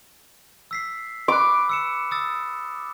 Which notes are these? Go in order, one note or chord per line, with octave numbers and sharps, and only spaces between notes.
E6 B6 C7
B5 D6 F#6
E6 C#7 E7
D#6 E6 A6